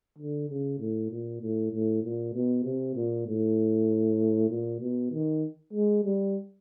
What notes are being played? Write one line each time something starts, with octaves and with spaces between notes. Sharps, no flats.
D3
C#3
A2
A#2
A2
A2
A#2
B2
C3
A#2
A2
A#2
B2
D#3
G#3
G3